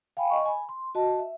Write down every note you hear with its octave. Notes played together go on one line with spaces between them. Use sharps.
F5 G5 G#5 B5
D#5 C#6
G#5 B5
C6
F#4 D#5 A5
E5